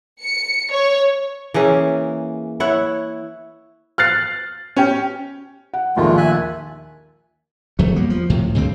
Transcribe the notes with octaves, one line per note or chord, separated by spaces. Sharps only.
C#7
C#5
E3 A#3 C#4 G#4
E4 C#5 F#5
F6 F#6 A6 C7
C#4 G4
F#5
A#1 D#2 G#3 A3 F4
E5 G#5 F#6
D1 E2 F#3 A3
G3 A#3 B3
F3
C2 F2 A2 C3
D2 G2 C#3 C4